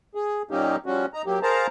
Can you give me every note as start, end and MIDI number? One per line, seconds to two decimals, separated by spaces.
0.15 0.42 68
0.51 0.76 46
0.51 0.76 54
0.51 0.76 58
0.51 0.76 61
0.51 0.76 63
0.51 0.76 67
0.86 1.06 53
0.86 1.06 55
0.86 1.06 61
0.86 1.06 66
1.14 1.22 63
1.14 1.22 82
1.26 1.39 54
1.26 1.39 58
1.26 1.39 67
1.43 1.67 68
1.43 1.67 70
1.43 1.67 72
1.43 1.67 77
1.43 1.67 81
1.43 1.67 82